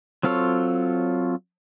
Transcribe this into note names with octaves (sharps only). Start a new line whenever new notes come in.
F#3 C4 F4 A4 C#5